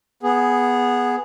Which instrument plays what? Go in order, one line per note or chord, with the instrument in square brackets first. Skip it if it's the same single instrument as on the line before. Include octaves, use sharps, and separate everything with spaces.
[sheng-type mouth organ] B3 G#4